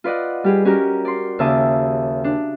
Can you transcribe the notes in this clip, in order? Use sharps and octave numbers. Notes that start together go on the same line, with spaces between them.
F4 B4 D5 D#5 F#5
G3 G4 G#4
C#4 F#4 G4 A#4
D5 C6
D#2 C#3 E5 A5 D6 D#6
D4